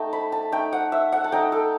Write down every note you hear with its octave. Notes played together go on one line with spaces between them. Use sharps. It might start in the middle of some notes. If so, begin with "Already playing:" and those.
Already playing: A3 D#4 G5 A5
B5
A5
A3 D#4 G5
F#5
E5
F#5
A5
A3 D#4 G5
A4